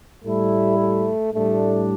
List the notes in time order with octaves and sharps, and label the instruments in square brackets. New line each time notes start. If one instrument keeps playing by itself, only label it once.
[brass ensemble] A2 G3 E4 [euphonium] A3
[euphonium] A3
[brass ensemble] A2 G3 D4 [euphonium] A3